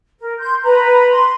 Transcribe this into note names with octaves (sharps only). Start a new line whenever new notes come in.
A#4
C6 G6
B4 A#5 B5
C6